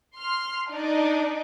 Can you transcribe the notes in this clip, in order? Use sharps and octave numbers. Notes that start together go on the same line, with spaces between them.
C6 F6
D4 D#4 D5 D#5